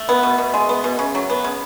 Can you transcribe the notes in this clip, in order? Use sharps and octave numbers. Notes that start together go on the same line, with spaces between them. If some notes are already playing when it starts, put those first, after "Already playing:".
Already playing: A3
B3
B2
B2
G#3
B3
B2
C#3
F#3
B3
C#3